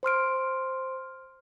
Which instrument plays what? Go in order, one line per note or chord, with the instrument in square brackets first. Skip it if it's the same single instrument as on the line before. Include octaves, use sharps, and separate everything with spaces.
[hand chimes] C5 C6 F6 D7